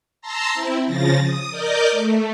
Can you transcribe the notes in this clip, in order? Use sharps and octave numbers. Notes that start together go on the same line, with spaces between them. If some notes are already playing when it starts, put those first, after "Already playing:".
A5 A#5 C6 E6 A#6
C4 E4
C#3 F3 A6 A#6
D#6
A#4 D5 D#5 D6 G6
A3